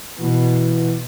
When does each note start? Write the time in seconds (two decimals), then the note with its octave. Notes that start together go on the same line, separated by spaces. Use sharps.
0.20 B2 E3